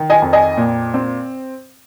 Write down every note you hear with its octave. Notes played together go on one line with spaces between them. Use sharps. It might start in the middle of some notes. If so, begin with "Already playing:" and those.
Already playing: D#3
D#5 G#5
F2
D#5 G#5
A#2
C4